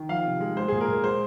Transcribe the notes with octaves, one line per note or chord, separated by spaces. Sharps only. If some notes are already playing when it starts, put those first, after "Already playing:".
Already playing: D#3
F3 F5
C3
G#3
G#3 C5
A#2 G#4
A#4
A#2
G#3 C5